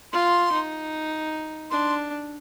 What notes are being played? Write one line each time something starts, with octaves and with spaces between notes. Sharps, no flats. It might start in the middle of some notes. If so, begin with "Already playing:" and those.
F4 C6
D#4
D4 C6